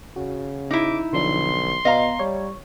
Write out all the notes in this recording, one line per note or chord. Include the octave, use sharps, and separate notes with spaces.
C#3 F#4
D#4 E4 D6
B1 D3 F3 D4 C6
B2 B3 D#5 F5 A#5
G3 C#5